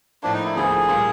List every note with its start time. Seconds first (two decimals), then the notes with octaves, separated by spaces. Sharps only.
0.23 A2 F3 A#3 D4
0.33 D#4
0.45 E4
0.56 D2 D3 F3 A#3 G#4
0.88 A#2 G3 A#3